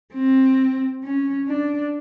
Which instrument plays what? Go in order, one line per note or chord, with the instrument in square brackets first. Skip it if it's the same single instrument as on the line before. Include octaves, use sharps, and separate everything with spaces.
[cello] C4
C#4
D4